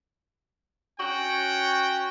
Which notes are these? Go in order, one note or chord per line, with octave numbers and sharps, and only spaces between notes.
C#4 F#4 G5